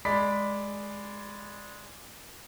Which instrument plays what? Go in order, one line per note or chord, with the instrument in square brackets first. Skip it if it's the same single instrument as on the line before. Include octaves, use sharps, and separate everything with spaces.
[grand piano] G#3 D5 B5 B6